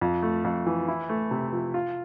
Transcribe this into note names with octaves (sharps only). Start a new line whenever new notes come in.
F2
A3
F2
E3
E4
A3
C3
F3
F4